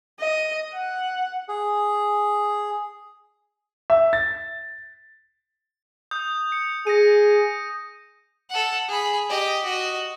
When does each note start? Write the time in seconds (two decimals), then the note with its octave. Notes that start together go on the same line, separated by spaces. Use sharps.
0.20 D#5
0.74 F#5
1.49 G#4
3.90 E5
4.13 A6
6.11 D#6 G6
6.52 C#7
6.87 G#4 A#6 C#7 D#7
8.50 A4 F#5
8.88 G#4 B5
9.29 G4 D#5
9.64 F#4 D#5